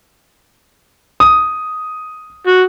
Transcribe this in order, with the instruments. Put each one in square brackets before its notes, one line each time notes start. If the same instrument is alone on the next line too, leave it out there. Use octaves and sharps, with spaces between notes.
[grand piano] D#6
[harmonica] F#4